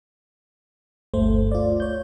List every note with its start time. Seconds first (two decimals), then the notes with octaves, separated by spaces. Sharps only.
1.14 G1 D2 A3 C5
1.51 F4 D5
1.80 C#5 G6